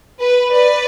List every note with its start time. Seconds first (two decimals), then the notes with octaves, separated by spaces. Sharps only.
0.20 B4
0.52 B4 D5